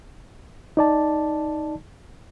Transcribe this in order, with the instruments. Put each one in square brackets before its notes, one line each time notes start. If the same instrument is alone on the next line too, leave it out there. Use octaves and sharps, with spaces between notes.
[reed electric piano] D#4 D5 A5